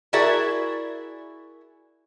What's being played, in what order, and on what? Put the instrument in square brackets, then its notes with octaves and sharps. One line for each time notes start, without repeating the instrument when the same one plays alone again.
[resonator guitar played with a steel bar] E4 F#4 G#4 A#4 D5 E5